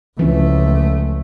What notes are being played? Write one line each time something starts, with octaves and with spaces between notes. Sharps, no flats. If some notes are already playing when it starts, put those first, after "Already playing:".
C#2 E3 F3 A3 C#4